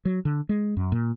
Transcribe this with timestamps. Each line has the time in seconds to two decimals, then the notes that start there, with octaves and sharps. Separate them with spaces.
0.05 F#3
0.25 D3
0.49 G#3
0.77 F#2
0.92 A#2